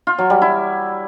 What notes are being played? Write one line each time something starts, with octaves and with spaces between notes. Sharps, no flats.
F4
F#3
G3
E4